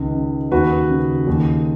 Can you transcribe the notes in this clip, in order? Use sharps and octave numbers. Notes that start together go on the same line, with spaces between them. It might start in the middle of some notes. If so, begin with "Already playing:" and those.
Already playing: C#2 D#3
C#3
D#2 F#4 B4
C#3
D#2